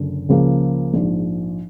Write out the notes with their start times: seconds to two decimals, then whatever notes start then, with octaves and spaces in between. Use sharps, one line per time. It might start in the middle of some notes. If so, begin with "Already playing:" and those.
Already playing: F#1 F#2 D3
0.29 C#2 C#3 F3 A#3
0.94 A#1 G#2 F3